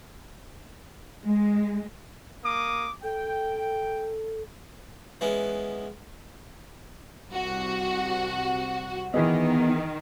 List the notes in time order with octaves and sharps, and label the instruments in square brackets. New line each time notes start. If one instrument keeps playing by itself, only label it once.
[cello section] G#3
[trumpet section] A#3 D6 D#6
[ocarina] A4 [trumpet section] G5
[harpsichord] E3 G#3 B3 C#4
[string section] C2 F#4
[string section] D#3 [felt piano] E3 G#4 D#5 [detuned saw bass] B3